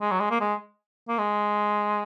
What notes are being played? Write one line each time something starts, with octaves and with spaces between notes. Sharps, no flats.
G#3
F#3
G#3
A#3
G#3
A#3
G#3